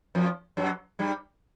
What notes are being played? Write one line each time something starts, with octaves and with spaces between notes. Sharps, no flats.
F2 F3
F#2 F#3
G2 G3